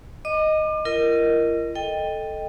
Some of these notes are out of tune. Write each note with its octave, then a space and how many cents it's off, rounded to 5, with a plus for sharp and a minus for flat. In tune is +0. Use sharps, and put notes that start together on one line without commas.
D#5 +0 D6 +35
F4 -45 A#4 +0 D#5 +0
A4 +0 D#5 +0 G5 +10